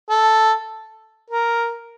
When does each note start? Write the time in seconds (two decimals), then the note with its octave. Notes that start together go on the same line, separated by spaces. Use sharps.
0.10 A4
1.30 A#4